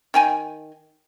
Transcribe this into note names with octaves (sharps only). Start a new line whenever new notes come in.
D#3 G5 G#5